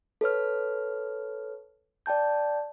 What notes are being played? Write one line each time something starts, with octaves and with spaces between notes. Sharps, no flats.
A4 B4 C#5 F6
D5 G5 A5 G6